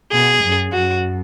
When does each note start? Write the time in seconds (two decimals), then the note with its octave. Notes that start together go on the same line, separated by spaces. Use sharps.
0.12 B2 G#4
0.43 F#2
0.72 F#2 F#4